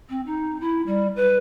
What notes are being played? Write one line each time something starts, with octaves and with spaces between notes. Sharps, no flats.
C4
D#4
E4
G3
B4